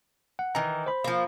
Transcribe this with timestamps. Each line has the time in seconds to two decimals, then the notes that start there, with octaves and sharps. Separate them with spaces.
0.39 F#5
0.55 D#3 E3 A#5
0.86 C5 B5
1.04 F3 A#3